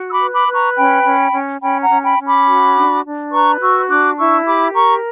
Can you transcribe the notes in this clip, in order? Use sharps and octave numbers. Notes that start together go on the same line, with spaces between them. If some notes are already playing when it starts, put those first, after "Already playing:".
Already playing: F#4
E6
B5 D6
B4
B5 D6
B4
A#5 C#6
C#4 G5 B5
C#4
C#4
C#4 G5 B5
F#5 A#5
C#4
G5 B5
C#4
B5 D6
F#4
D4
D4
B4 A#5 C#6
F#4 C#6 E6
D4 D6 F#6
E4 C#6 E6
G4 B5 D6
A#4 A#5 C#6